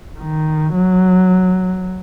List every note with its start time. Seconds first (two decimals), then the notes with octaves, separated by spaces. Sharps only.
0.18 D#3
0.75 F#3